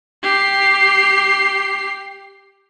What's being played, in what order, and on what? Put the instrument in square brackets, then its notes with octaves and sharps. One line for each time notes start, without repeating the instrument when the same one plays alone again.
[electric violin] G4 C7